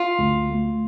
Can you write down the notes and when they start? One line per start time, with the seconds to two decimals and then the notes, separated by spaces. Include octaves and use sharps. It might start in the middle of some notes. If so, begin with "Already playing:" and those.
Already playing: F4
0.18 D2
0.49 A3